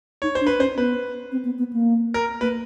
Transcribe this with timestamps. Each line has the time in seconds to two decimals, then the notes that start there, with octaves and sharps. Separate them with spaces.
0.22 D#4 C#5
0.35 C5
0.41 D4
0.47 B4
0.59 C#4 C5
0.77 B3 B4
1.32 C4
1.45 B3
1.58 B3
1.73 A#3
2.14 A#4
2.41 A#3 B4